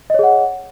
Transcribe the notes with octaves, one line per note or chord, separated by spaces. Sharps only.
G#4 C#5 D#5 F#5